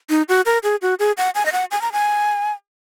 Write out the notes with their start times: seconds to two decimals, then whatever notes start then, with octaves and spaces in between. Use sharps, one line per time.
0.10 D#4
0.29 F#4
0.46 A#4
0.63 G#4
0.82 F#4
0.99 G#4
1.17 F#5
1.35 G#5
1.46 D#5
1.52 F#5
1.71 G#5
1.82 A#5
1.92 G#5